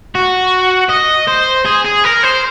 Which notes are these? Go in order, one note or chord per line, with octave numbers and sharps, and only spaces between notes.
F#4
D#5
C5
G#4
G#4
A#4
C5